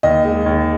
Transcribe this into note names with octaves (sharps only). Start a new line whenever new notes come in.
D#2 D#5
G#3
D#2